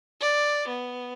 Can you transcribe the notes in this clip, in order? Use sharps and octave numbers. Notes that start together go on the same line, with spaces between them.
D5
B3